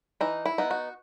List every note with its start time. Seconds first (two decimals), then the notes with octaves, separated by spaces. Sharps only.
0.21 E3 D#4
0.46 E4
0.58 B3 D#4
0.71 F#4